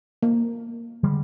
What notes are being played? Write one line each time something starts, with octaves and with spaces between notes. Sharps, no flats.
A#3
D3 G3 G#3